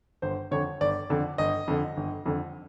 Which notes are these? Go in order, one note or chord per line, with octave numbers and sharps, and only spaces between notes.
G1 C5
F2 D3 C#5
G1 D5
F2 D3
G1 D#5
F2 D3
G1
F2 D3